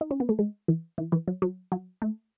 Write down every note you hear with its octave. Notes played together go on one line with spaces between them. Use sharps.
D#4
C#4
B3
A3
G#3
E3
E3
E3
F#3
F#3
F#3
A3